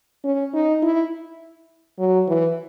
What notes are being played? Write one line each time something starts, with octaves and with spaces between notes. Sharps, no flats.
C#4
D#4
E4
F#3
E3